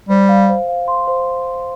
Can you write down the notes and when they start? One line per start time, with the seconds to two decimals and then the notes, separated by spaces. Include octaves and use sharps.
0.09 G3 C5
0.29 F5
0.49 C5
0.68 F5
0.88 C6
1.07 C5